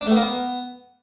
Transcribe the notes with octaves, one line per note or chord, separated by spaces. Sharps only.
D4
A3
B3
A#3
B3